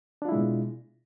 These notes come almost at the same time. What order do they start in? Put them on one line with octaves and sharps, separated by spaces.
D4 F4 E4 G#3 B2